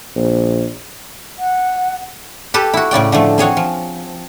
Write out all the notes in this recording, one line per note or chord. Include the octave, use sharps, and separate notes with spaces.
A#1
F#5
G4 A4 B4
E4 F#4
A2 C#3 D5 G5
D3 F3 A3
C4 G#4 C#5 F#5
F3